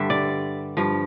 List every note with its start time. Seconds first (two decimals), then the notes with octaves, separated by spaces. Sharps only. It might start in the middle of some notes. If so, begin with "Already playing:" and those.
Already playing: G2 D3 G3 E5
0.10 D5
0.77 G2 F3